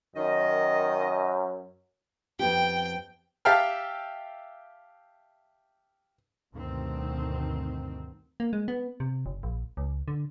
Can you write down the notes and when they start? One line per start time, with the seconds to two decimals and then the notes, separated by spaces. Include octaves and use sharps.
0.16 F#2 D#3 D#5
2.39 F2 B3 G4 G5
3.45 G4 E5 F5 G5 A5 F6
6.54 D2 G2 B2 D#3 C4
8.40 A#3
8.53 G#3
8.68 B3
9.00 C3
9.26 F#1
9.43 A#1
9.77 C#2
10.08 D3